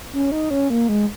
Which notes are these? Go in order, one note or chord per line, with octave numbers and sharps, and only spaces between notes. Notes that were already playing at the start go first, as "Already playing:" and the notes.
C#4
D#4
C#4
A#3
G#3